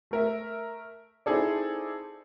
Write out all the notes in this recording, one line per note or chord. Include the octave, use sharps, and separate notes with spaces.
A3 A#4 E5
C4 D#4 E4 G#4 A4 D5